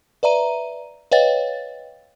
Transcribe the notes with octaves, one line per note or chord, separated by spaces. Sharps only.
B4 D5 E5 A#5 D#7
B4 C#5 D#5 F5 G5 A6